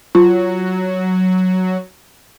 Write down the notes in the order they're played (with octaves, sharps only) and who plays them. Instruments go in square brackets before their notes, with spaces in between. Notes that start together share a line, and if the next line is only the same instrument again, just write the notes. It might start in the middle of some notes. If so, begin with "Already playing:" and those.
[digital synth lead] F#3 [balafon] F4